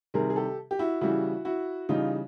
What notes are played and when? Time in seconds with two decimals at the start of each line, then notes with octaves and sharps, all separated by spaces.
0.14 C3 D#3 G3 G#4 A#4
0.30 G#4
0.36 G4 A4
0.71 G4
0.79 E4 F#4
1.01 C#3 E3 G3 E4 F#4
1.45 E4 F#4
1.89 C#3 E3 G3 D#4 F4